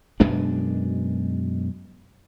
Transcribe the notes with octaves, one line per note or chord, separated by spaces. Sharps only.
F#2 B2 G#3 D4